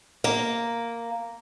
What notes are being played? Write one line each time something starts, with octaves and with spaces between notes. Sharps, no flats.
A#3